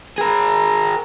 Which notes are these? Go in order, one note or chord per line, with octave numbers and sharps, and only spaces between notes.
G#4 A#4